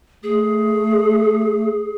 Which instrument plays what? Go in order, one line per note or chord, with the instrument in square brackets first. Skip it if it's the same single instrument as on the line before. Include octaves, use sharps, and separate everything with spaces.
[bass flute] A3 [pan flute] G#4